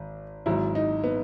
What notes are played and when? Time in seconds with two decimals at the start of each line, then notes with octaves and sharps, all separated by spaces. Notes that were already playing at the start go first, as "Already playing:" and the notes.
Already playing: G#1
0.46 G#1 G#2 F#3 E4
0.75 D#4
1.04 B3